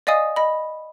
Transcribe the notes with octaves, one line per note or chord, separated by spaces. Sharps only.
D5 D#5 F5 G#5 D#6
D#5 B5